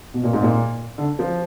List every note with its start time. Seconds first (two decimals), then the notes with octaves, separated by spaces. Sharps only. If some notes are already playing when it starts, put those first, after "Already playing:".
0.14 B2
0.24 A#2
0.33 G#2
0.42 A#2
0.98 D3
1.19 F3